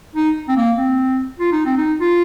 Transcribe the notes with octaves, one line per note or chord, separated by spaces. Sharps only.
D#4
C4
A#3
C4
F4
D#4
C4
D#4
F4